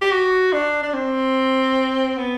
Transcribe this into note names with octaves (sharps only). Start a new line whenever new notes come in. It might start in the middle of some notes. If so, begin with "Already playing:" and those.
G4
F#4
D4
D4
C4
B3